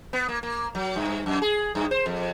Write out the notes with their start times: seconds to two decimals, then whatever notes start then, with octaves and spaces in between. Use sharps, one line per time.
0.13 B3
0.28 A#3
0.43 A#3
0.75 F#3
0.96 G2
1.26 F#2
1.42 G#4
1.75 G2
1.91 C5
2.06 F2